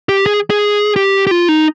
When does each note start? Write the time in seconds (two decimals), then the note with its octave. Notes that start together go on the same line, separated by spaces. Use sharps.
0.09 G4
0.26 G#4
0.50 G#4
0.96 G4
1.27 G4
1.31 F4
1.49 D#4